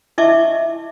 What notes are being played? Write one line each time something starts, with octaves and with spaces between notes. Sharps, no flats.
E4 D#5 E5 A5 C#6 D6